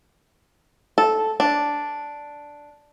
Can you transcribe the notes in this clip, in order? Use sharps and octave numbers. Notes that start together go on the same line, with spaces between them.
A4
D4